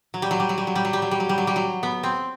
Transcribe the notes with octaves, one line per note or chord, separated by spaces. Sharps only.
F#3
G3
F#3
G3
F#3
G3
F#3
G3
F#3
G3
F#3
G3
F#3
G3
F#3
G3
F#3
B3
C4